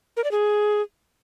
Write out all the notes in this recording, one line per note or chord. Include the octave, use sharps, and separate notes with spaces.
A#4
D5
G#4